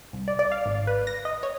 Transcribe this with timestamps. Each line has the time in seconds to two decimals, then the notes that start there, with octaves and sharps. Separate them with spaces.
0.13 C2
0.28 D5
0.39 D5
0.52 F5
0.66 G#1
0.87 B4
1.07 A#6
1.25 D#5
1.43 C#5